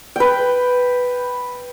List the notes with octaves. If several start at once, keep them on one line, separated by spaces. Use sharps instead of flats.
B4 G5